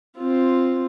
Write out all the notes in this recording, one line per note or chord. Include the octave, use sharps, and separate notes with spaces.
C4 F4